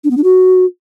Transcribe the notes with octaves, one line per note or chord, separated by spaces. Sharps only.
D4
B3
D4
F#4